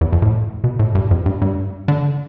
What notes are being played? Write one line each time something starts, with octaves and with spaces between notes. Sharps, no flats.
E2
F2
A2
B2
A2
G2
F2
G2
G2
D3